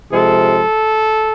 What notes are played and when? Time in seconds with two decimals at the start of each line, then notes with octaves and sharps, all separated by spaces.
0.12 C3 F3 G#3 A4